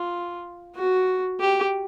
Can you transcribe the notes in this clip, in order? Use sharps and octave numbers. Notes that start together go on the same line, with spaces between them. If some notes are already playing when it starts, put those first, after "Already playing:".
Already playing: F4
F#4
G4